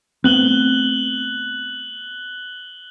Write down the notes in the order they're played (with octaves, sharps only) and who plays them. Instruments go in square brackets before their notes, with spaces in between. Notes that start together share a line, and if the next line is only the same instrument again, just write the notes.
[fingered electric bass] A3 B3 C4 [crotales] F#6 F#7 G7